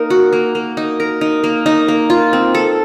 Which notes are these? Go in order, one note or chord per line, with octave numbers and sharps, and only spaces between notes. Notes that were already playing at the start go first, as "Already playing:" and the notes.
Already playing: A#3 D#4 A#4
F#4
A#3
A#3
D#4
A#4
D#4
A#3
D#4
A#3
F4
C4
A4